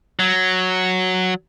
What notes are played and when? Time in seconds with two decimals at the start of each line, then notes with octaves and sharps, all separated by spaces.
0.20 F#3